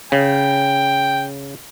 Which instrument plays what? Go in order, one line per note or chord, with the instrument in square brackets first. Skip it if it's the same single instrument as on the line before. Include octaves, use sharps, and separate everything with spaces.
[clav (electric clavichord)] C#3 [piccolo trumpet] G5